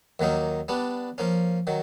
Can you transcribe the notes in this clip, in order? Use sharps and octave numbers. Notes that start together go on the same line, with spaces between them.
D#2 D#3 F#3 A#3 D#4
G3 B3 D4
F3 A#3 C#4
D#3 F#3